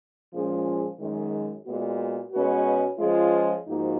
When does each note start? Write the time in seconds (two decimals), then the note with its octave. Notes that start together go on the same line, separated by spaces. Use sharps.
0.32 A#2 F3 G#3 C#4 G#4
0.98 F#2 D#3 G#3
1.65 A#2 G#3 B3 F#4
2.32 B2 G#3 C#4 F#4 B4
2.98 F3 G#3 C#4 F4 G#4
3.66 G#2 F3 A#3 D#4 F#4